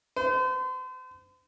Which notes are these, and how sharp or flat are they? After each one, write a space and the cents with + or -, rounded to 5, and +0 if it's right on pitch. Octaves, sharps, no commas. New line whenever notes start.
C5 -40